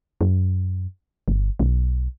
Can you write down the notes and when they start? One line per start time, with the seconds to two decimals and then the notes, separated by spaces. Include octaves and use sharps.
0.21 F#2
1.28 G1
1.59 B1